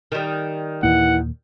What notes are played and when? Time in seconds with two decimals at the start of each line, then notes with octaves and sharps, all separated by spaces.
0.12 D#3 G3
0.83 D#2 A#2 E3 A#3 F#5